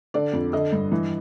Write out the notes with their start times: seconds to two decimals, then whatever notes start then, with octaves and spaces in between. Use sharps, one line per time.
0.14 D3 D5
0.33 F2
0.53 D3 D#5
0.72 G2
0.92 E3